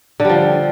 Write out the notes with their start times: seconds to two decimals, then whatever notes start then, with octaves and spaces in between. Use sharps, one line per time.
0.20 D3
0.25 G3
0.30 F3